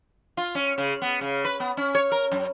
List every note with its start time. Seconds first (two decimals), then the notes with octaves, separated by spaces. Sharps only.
0.37 F4
0.55 C#4
0.78 C#3
1.02 B3
1.21 C#3
1.45 B4
1.60 B3
1.77 C#4
1.95 C#5
2.12 A#4
2.32 F#2